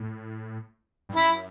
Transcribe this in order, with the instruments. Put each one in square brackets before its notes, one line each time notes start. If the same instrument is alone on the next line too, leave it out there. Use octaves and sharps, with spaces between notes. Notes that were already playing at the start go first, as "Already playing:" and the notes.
Already playing: [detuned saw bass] A2
G2
[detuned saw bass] F#2 [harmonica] E4